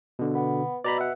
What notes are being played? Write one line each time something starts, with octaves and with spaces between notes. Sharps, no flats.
B2 D3
B3
B2 D5 A#5 B5
E5 F#5